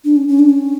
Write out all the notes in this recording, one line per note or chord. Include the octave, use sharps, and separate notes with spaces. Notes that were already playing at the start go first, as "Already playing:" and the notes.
D4
C#4
C#4
D4
C#4